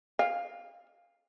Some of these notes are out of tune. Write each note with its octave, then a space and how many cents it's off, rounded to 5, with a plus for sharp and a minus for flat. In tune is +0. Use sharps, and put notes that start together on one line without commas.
F5 +0 G#5 -40